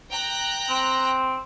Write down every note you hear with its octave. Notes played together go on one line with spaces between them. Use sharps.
G5 A#5 F#6
C4